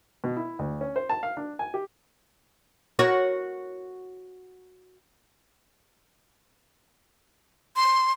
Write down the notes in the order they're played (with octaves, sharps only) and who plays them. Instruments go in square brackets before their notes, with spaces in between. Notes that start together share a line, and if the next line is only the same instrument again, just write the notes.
[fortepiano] B2
E4
D2
C#4
C5
A5
F5
D4
G#5
G4
[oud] F#4 A#4 C#5
[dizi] C6